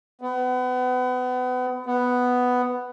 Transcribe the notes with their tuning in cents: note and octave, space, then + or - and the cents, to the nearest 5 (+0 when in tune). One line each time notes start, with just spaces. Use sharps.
B3 +30
B3 +5